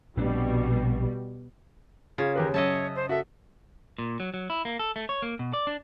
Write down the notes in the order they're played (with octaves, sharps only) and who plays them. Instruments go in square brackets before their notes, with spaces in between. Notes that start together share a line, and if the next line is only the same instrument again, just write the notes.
[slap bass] A#1 C4 D4 [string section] B2 G3
[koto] C#3 [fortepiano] F4 [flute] G#6
[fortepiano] D#2 G4 B4 [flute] A#4
[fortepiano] F#2 [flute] C#5 [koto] D#5 E5 A5
[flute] C5
[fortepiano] F#4 A4 [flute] E5
[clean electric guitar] A#2
F#3
F#3
E4
A#3
A4
A3
C#5
A#3
B2
D5
D4